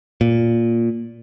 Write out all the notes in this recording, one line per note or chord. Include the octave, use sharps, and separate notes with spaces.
A#2